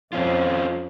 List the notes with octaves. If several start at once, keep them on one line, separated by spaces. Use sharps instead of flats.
F2 C4 C#4 F4